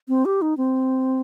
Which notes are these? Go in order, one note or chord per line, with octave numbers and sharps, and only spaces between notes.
C4
G4
D#4
C4